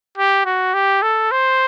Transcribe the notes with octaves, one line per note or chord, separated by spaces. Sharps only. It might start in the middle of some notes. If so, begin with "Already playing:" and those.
G4
F#4
G4
A4
C5